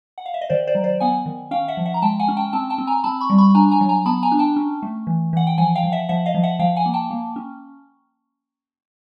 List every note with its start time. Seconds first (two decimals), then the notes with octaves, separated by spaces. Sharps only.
0.18 F#5
0.26 F5
0.34 E5
0.41 D#5
0.50 D#3 C5 D5
0.67 C5 D5
0.75 F#3
0.84 C5 D5
1.00 B3 F#5 G#5
1.26 D#3
1.51 C#4 F5 G5
1.68 E5 F#5
1.77 F3
1.86 E5 F#5
1.94 A#5
2.02 G#3 G5 A5
2.19 F#5 G#5
2.28 C#4
2.37 G5 A5
2.53 C4 G5 A5
2.70 G5 A5
2.78 C4
2.87 G#5 A#5
3.04 C4 A5 B5
3.20 B5 C#6
3.30 G3
3.38 B5 C#6
3.54 D4 G#5 A#5
3.71 G#5 A#5
3.81 F#3
3.89 G#5 A#5
4.06 B3 A5 B5
4.23 G#5 A#5
4.32 D4
4.39 G5 A5
4.56 C#4
4.83 A3
5.07 E3
5.33 E3 F#5
5.47 G5
5.58 F3 F#5 G#5
5.75 F5 G5
5.83 F3
5.92 E5 F#5
6.09 F3 E5 F#5
6.26 D#5 F5
6.34 F3
6.43 E5 F#5
6.59 F3 F5 G5
6.76 F#5 G#5
6.86 A#3
6.94 G5 A5
7.11 A#3
7.36 C#4